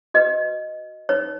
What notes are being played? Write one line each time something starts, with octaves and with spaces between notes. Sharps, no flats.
F#4 B4 D#5
D#4 B4 C#5